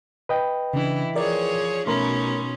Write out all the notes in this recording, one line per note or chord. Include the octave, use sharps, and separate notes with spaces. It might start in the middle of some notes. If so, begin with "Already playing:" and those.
B4 D#5 G5
C#3 E3 D4 E4
F3 G#4 A#4 C#5 D5
B2 A3 C#4 D#4 A#4 B5 C6